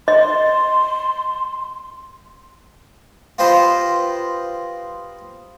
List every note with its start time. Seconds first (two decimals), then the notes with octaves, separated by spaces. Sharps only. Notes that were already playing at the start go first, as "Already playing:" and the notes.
0.08 D#5 C6
3.38 F4 G4 B4 C5 D#5